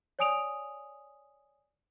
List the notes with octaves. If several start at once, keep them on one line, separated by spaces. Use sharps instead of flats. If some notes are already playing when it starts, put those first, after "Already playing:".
C#5 D5 G#5 D#6 D7 F7